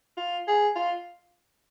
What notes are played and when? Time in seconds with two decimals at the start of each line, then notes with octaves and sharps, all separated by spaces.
0.17 F4
0.47 G#4
0.76 F4